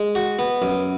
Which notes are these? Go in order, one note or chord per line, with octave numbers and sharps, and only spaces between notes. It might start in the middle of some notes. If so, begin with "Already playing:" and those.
Already playing: G#3
F#4
B3
F#2